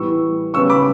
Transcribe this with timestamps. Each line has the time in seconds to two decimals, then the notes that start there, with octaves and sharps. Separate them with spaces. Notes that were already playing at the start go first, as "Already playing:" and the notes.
Already playing: A2 E3 G3 B3 C#6 E6
0.54 C#3 G3 B3 C#6 E6
0.70 B5 D6